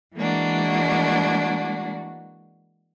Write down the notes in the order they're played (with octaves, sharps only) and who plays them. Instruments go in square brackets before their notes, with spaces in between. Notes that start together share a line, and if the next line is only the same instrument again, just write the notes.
[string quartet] E3 G#3 A#3 D4 F#4